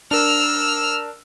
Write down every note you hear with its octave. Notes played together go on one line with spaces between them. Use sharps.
D4 A#4 E6 F6